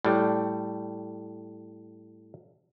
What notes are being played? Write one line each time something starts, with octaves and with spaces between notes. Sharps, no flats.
A2 G3